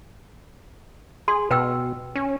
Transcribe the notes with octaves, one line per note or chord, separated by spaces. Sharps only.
G#4 C6
B2 B4 G5 E6
C#4